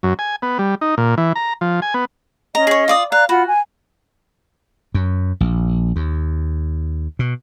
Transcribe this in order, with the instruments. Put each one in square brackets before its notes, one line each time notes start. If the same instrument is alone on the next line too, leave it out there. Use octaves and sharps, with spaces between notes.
[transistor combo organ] F#2
G#5
B3
G3
D#4
A#2
E3
A#5
F3
G#5
B3
[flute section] C#4 D#5 [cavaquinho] A#5
[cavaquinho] G#4 C#5
F4 D5 D#6
[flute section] D5 A#5 F#6 [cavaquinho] F5
[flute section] F4 F#5 B5 [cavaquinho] F#4
[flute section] G#5
[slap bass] F#2
A#1
D#2
B2